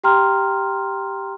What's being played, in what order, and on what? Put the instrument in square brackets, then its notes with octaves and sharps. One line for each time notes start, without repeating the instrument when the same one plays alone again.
[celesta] G4 G5 A#5 C6 F6